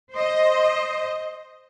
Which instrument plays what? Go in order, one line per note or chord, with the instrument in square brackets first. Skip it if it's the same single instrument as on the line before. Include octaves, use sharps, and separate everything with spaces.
[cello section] C5 D#5